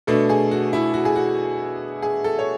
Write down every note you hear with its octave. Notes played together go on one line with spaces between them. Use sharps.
B2 A3 D4 A4
G#4
F#4
E4
F#4
G#4
F#4
G#4
A4
C#5